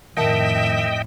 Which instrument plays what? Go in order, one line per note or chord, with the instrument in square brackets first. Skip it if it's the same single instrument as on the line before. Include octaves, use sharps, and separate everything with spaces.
[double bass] F2 A2 [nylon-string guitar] D#3 F#5 A5 [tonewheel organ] D#5 G5 [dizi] E5